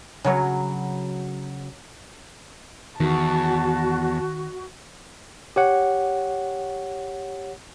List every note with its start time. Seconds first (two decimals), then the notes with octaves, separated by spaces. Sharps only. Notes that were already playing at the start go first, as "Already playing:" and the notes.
0.24 C#3 F#3 C#5
3.00 E2 D#3 F#4 A5
5.56 G4 C#5 F#5